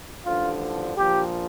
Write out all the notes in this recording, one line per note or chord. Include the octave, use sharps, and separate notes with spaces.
A1 G2 D3 F3 F4
A#1 A#2 F3 G4